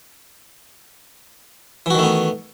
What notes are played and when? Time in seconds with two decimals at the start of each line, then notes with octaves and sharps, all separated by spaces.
1.86 E3
1.90 F#4
1.95 D#3
1.99 A3
2.03 B3